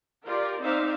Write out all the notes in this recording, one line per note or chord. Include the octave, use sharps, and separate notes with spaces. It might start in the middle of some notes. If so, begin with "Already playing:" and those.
F4 G4 A#4 D5
C4 D#4 C5 D5 E5 F5